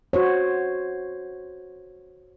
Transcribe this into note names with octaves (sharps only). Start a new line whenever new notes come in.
F#4 C5 C#5